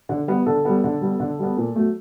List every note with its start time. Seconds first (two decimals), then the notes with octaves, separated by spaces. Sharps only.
0.09 D3
0.28 G3 B3
0.46 D3 A4
0.65 G3 B3
0.84 D3
1.01 G3 B3
1.20 D3
1.39 G3 B3
1.57 A#2
1.76 F#3 A3